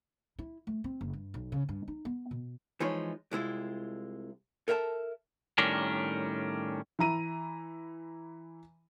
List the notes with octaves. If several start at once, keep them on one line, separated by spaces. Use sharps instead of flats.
E4
A3
C4
F#1
G2
B1
C#3
G2
D#4
B3
B2
E3 F3 G#3 D#4 C#5
C2 G#3 E4 F4
A4 A#4 E5 G5 A5
A2 D#3 G3 C#4 D4 A#4
E3 E4 A#5 D#7